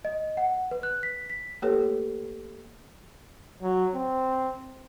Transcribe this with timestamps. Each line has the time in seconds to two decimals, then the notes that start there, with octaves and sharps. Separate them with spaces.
0.05 D#5
0.37 F#5
0.71 B4
0.83 F#6
1.03 B6
1.30 B6
1.62 A3 A#3 G4 A4 B4 C#5
3.62 F#3
3.95 C4